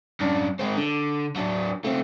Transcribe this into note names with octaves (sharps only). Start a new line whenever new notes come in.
F#2 D4
G#3 C4
D3
F#3 D4
A3 C4